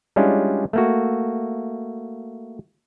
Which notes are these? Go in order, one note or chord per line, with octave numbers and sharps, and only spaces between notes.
G3 G#3 C#4 D4 E4 F4
A3 A#3 F#4